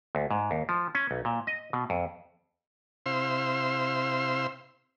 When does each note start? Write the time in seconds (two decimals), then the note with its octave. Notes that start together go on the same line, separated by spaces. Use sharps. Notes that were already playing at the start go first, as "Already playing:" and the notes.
0.15 D2
0.31 G#2
0.51 D#2
0.69 F3
0.95 C#4
1.11 B1
1.25 A#2
1.47 D#5
1.73 B2
1.90 F2
3.06 C3 E4 C5 F5 C6 E6